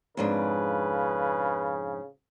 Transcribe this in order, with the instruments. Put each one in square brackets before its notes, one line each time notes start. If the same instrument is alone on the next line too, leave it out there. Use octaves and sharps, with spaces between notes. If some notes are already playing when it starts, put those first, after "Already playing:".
[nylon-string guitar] F2 G#2 D4 [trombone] C#3 [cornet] B4